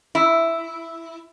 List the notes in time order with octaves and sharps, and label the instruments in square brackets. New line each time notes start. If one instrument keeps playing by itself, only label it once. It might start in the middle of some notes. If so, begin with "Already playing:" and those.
[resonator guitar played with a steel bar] E4